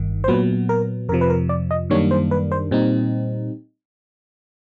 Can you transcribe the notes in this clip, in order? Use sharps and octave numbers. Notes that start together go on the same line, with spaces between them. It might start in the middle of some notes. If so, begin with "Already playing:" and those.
Already playing: G1 G2 D#3
C5
A#2 F#3 B3 B4
A#4
F2 C3 F3 A#4
B4
A#4
D5
D#5
F#2 D#3 G3 A#3 D4 C#5
C5
B4
C5
A#2 G3 C4 D#4